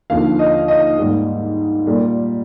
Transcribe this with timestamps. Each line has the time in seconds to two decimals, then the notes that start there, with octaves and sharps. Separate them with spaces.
0.10 D#2 D3 F3 F5
0.39 D#5
0.68 D#5
0.98 G#2 D#3 G3 A#3
1.86 A#2 G3 A#3